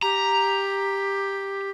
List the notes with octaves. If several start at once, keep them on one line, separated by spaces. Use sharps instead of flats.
G4 A#5